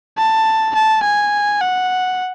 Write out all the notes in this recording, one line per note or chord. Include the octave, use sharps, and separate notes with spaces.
A5
A5
G#5
F#5